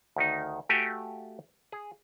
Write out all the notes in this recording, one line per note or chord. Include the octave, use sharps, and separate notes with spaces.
D2 D#3 D#4
A3 F#4 G4 F5 G5 G#5
G#4